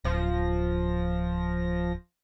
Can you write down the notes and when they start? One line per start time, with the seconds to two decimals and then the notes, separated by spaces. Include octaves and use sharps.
0.05 D1 F3 A#6